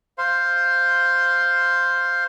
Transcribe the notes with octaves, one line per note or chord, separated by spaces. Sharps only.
C5 F5 C6